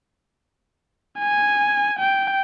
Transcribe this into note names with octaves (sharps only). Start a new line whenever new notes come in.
G#5
G5